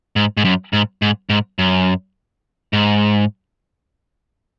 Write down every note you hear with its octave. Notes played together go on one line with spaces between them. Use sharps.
G#2
G#2
F#2
G#2
G#2
G#2
F#2
G#2